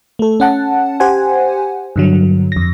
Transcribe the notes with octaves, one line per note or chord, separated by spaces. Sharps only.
A3 A4
C#4 F#5 A5
G4 C5 F#5 G#5
G2 D3 F#3
F2 A#6